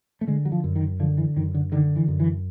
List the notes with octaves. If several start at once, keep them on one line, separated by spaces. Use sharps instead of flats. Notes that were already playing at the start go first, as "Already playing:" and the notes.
A3
D3 G#3
F#3
F3
F#2
D#3
D3 F3
E3
F#2 D#3
D3
D3 D#3
E3
F#2
E3